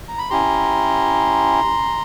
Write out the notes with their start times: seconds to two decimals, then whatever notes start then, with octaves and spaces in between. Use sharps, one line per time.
0.08 A#5
0.18 B5
0.30 C#4 E4 G4 A#5 C6